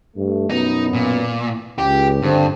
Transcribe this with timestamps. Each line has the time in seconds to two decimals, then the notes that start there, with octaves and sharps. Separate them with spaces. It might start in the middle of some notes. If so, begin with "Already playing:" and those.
0.17 G2 A3
0.50 F#2 B2 B3 D#4
0.93 A#2
1.78 C#2 G4
2.22 G2 D3 C4